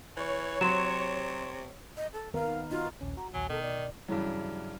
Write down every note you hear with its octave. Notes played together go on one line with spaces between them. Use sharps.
E3 C#5
C3 F#3 C6 E7
D#5
A4
D#3 B3 A#4 F5
D#4 F4 F#4
A#1 D#2 C#4
F#4 A#5
A#1 D#2 F#3 G#5
B2 D#3 A4
D5
G2 C#3 E3 F#3